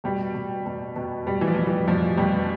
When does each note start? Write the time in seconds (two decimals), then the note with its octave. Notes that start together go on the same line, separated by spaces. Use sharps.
0.04 B2 G3
0.34 B2
0.66 B2
0.96 B2
1.27 B2 G3
1.41 E3
1.47 F3
1.57 B2
1.67 E3
1.88 B2 F3
2.17 B2 G3